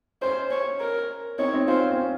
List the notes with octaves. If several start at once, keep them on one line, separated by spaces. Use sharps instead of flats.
C#4 C5
C#5
A#4
C4 D#4 C#5
C4 D#4
C#4 F4 C5
C#4
C4
C#4